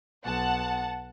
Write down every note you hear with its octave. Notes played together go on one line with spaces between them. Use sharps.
B1 F#5 A5